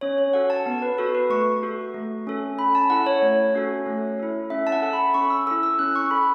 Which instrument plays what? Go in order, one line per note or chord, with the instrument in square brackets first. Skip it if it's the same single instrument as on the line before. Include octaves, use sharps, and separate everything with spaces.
[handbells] C#4 C#5
C#5
F#4 A4 F#5
A5
B3
B4
F#4 A4
B4
A3 C#6
F#4 A4
A3
C#4 A4
C#4 B5
A5
E4 A4 F#5
C#5
A3
C#4 F#4 A4
A3
E4 A4
C#4 E5
A5
F#5
A4
B5
C#4 C#6
E6
E4 A4 E6
E6
C#4 F#6
C#6
A4 B5